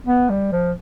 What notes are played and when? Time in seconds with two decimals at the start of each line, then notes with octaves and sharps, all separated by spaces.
0.07 B3
0.29 G3
0.52 F3